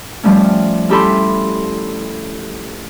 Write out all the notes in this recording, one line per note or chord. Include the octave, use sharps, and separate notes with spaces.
F3 G3 A3 C#4
C#4 E4 G4 A4 B5 C6